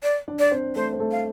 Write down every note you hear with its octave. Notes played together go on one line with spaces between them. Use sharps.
D5
D4 D5
D5
C4 C5
A3 A4 C5
C5
A3 A4
F5